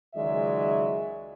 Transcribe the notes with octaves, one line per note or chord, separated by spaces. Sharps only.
C#2 D#3 F#3 G#3 D5 E5